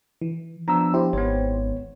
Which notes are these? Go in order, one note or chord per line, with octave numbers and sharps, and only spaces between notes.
E3
F3 B3 D4 A#5 E6
E4 G4 C5
G#1 B3 C#5